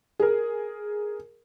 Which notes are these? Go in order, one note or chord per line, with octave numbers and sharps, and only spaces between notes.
G#4 A#4